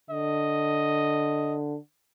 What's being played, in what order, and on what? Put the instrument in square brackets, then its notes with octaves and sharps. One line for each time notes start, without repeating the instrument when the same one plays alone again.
[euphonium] D3 [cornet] D#5